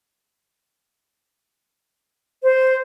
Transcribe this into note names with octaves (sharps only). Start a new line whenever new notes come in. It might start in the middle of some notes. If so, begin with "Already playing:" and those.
C5